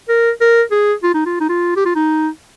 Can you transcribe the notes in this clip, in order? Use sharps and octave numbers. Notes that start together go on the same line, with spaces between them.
A#4
A#4
G#4
F4
D#4
F4
D#4
F4
G4
F4
D#4